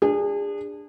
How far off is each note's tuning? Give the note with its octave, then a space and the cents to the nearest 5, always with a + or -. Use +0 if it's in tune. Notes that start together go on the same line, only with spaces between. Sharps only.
D4 +0 G#4 -30